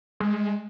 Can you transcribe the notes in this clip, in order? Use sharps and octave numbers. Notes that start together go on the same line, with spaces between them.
G#3